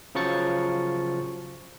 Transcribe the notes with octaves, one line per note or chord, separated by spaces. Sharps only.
C#3 F3 F#3 C#6 A6 C#7